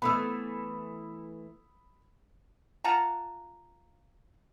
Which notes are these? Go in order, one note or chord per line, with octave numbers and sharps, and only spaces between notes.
E3 A3 B3 B5 D#6 E6
F4 F#5 A5 A#5